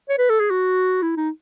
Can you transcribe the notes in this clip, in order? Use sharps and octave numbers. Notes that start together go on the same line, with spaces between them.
C#5
B4
A4
G#4
F#4
E4
D#4